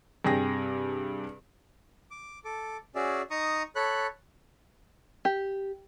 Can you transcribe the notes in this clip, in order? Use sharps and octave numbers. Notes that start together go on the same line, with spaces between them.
G2 C3 G#4 G5 A#6
D6
A4 D6
C#4 F#4 G#4 D5 E5
D#4 A#5 C#6 D#6
A4 C#5 B5 F#6
G4